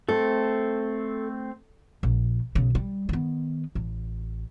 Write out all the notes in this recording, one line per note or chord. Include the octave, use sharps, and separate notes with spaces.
A3 C4 A4
A#1
B1 C#3
G3
D#3 B3
A1